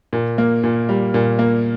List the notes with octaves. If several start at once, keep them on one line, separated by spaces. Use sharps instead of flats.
A#2
A#3
A#2
G3
A#2
A#3